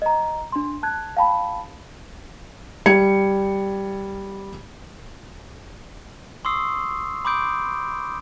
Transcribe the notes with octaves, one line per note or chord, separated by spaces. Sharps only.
D#5 A#5
D4 C6
A5 F#6 G#6
F5 G5 A5 B5
G3 G#6 C#7
C6 C#6 D#6 E6 C7
B5 C6 D6 D#6 G6 D7